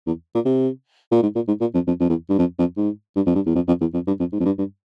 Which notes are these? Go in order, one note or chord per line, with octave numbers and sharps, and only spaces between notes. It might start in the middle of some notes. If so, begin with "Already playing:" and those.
E2
A#2
C3
A#2
G#2
A#2
G#2
A#2
F2
F2
F2
E2
G2
F2
F2
G#2
G2
F2
G2
E2
F2
F2
E2
F2
G2
F2
G#2
F2
G2
G2